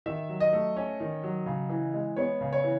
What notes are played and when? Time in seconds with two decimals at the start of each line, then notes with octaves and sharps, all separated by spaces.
0.06 D#3 E5
0.29 F#3
0.40 D#5
0.53 A3
0.76 C#4
1.00 D#3
1.23 F#3
1.46 C#3
1.69 E3
1.94 G#3
2.16 B3 C#5
2.41 C#3
2.52 C#5
2.64 E3